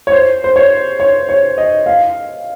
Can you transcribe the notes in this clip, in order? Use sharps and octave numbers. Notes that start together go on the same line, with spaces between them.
C#5
C5
C5
C#5
C#5
C#5
D#5
F5